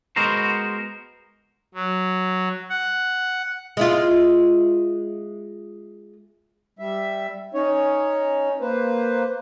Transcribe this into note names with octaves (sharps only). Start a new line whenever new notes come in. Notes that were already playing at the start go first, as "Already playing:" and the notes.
G#3 B3 F#4 A#4 C5
F#3
F#5
G#3 E4 F4
G3 E5
C#4 D#4 C#5
A#3 B4 C5